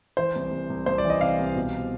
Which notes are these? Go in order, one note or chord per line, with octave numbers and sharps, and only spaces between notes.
E3 C5
C2
C2
C2
C2 C5
D5
E3
D#5
C3 F5
C2
B2